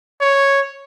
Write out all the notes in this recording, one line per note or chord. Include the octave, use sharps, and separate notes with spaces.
C#5